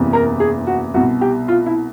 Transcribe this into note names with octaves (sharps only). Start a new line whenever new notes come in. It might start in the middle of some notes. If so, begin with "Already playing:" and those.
Already playing: F#1 E2 C3
A#4
G#4
F#4
C2 B2 F#4
G4
F4
E4